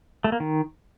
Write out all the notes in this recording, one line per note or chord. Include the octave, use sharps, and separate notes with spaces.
A3
A#3
D#3